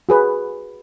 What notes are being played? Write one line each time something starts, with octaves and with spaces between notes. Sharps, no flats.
F#4 G#4 B4